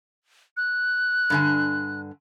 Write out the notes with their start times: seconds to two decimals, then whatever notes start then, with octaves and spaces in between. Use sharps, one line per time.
0.57 F#6
1.30 G2 D3 G#5